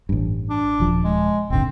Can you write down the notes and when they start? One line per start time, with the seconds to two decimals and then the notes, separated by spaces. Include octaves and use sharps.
0.09 A1 G2
0.50 D4
0.80 D#1 F3
1.04 G#3
1.50 D#1 G#1 D3 C4